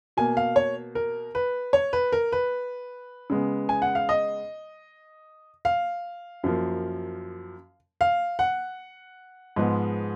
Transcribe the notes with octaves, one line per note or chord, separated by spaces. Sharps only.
B2 A#3 G#5
F5
C#5
A#4
B4
C#5
B4
A#4
B4
C#3 G#3 B3
G#5
F#5
F5
D#5
F5
F#2 F3 A#3
F5
F#5
G#2 F3 G#3 B3